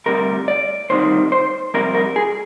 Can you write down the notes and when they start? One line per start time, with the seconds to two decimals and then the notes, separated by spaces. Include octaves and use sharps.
0.06 D2 C3 G3 A#4
0.48 D5
0.90 D2 C3 D#3 G3 C5
1.32 C5
1.74 F2 C3 G3 A#4
1.95 A#4
2.16 G#4